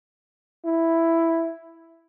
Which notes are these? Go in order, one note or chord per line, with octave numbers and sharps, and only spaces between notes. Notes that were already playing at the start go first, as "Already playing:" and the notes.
E4